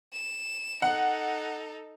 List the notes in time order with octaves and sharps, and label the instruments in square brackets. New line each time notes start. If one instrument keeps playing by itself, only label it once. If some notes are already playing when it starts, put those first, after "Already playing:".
[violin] E7
[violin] D#4 A4 [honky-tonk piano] F#5